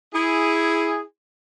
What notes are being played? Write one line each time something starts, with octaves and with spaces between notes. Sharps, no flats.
E4 G#4